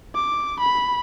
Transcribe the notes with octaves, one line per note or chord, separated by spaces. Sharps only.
D6
B5